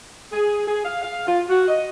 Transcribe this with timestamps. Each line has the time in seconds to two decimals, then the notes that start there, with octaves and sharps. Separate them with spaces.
0.32 G#4
0.66 G#4
0.85 F5
1.02 F5
1.26 F4
1.49 F#4
1.68 D#5